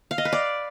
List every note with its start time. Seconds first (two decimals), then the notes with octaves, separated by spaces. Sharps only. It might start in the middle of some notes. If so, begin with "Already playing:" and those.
0.11 F5
0.18 D#5
0.25 B4
0.32 D5